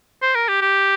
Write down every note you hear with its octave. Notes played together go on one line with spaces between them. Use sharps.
C5
A#4
G4
G4